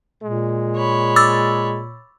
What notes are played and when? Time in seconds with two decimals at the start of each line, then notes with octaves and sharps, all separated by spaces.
0.23 A#2 G#3
0.77 C#5 B5
1.16 D6 E6 A6